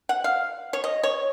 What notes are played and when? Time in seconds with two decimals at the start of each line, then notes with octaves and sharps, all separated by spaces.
0.09 F#5
0.24 F5
0.73 C#5
0.84 D#5
1.03 C#5